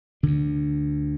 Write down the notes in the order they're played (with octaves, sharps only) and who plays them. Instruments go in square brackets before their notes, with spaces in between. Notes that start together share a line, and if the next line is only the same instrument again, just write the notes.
[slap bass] D2 D3 D4